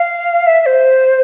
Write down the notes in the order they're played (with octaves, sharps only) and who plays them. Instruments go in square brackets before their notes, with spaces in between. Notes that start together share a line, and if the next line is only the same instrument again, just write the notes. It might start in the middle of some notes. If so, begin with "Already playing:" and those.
Already playing: [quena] F5
E5
E5
C5